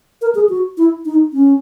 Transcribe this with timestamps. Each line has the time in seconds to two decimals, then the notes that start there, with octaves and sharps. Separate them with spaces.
0.21 A#4
0.35 G#4
0.49 F#4
0.77 E4
1.05 D#4
1.33 C#4